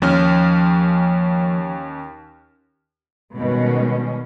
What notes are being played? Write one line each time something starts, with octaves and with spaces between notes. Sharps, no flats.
D#2 F3 C#4 F6
B2 D#3 G3 G#3 C#4